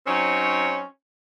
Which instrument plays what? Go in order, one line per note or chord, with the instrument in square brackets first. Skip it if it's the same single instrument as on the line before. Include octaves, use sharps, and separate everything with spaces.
[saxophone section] F#3 C4 C#4 D#4 C#5